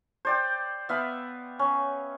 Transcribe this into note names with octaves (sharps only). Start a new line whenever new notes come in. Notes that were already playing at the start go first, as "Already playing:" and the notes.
C5 D5 G5
B3 E5 F5 B5
C#4